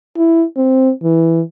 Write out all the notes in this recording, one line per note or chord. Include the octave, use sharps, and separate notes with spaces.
E4
C4
E3